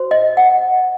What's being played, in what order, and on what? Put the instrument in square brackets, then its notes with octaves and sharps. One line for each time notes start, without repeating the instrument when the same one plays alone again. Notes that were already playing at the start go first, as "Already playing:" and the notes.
Already playing: [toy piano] F#4 C5
D#5
F#5